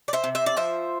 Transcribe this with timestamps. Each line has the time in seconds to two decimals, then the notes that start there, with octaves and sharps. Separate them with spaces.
0.08 D5
0.13 C5 E5
0.24 C3
0.35 C5 E5
0.46 D5
0.57 F3 C5 E5